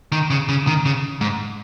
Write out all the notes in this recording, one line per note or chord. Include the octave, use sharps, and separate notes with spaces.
D#3
C#3
C#3
D#3
C#3
G#2